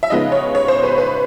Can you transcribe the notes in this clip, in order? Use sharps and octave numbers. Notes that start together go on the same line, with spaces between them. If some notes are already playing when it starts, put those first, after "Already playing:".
E5
C#3 F3 G#3 B3 D#4 D#5
C#5
C#5
C5
B4
B4